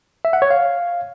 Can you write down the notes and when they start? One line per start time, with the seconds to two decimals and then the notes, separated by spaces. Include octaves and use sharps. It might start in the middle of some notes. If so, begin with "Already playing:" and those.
0.25 E5
0.33 F#5
0.42 C#5
0.51 F5